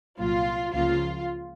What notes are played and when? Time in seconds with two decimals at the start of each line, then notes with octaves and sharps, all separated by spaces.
0.18 C2 A#2 F#3 F4
0.72 C#2 C#3 F3 A#3 F4